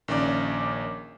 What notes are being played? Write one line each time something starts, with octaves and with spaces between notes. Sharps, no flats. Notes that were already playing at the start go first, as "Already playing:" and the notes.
A#1 D#3 A#3 C#4 D5 D6